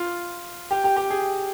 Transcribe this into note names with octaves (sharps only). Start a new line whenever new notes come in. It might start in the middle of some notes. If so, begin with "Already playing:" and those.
Already playing: F4
G4
G4
G4
G#4